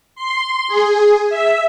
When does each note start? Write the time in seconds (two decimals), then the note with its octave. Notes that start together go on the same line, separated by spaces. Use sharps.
0.15 C6
0.68 G#4
1.29 E5